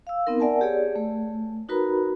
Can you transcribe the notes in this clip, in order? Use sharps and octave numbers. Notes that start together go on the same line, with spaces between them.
F5 E6
B3 C4 D#4 A#4
A#4 D5 E5 F#5 G#5 A5
G4 G#4 C#5 D5
A3
D#4 F#4 A#4 B4 A#5 B5